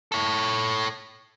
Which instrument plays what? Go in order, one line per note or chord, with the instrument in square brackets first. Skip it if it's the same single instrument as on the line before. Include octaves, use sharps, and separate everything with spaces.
[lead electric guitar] A4 C#5